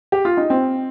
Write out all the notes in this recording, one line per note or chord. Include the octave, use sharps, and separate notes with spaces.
G4
F4
D#4
C4